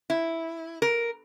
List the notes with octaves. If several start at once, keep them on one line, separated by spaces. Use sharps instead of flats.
E4
A#4